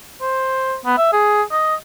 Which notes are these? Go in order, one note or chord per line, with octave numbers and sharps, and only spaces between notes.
C5
B3
E5
G#4
D#5